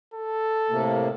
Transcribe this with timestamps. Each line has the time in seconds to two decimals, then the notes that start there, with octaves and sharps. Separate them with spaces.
0.14 A4
0.70 A2 C3 A#3